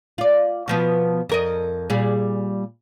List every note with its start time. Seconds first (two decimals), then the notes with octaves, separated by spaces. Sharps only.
0.18 F4 D5
0.68 B2 F3 B3
1.29 F2 A#4 D#5
1.90 A#2 G3 G#4